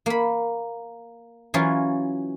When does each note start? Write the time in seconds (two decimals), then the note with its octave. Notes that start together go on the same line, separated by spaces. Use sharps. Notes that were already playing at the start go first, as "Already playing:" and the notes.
0.06 A#3 B5
1.54 E3 F#3 C#4 F4